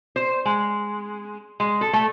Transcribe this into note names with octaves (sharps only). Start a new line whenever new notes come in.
C5
G#3
G#3
A4
A3